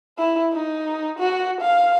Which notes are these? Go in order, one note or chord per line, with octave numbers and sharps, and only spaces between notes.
E4
D#4
F#4
F5